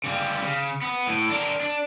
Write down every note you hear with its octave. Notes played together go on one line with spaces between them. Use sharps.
C#3 G3
C#3
B3
A2
D4 A#4
D4